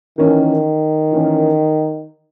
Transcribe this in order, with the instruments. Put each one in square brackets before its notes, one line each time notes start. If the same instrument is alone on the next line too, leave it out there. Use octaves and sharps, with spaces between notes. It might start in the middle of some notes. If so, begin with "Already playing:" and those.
[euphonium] D#3 [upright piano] E3 A#3 C#4
[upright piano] E3 A#3 C#4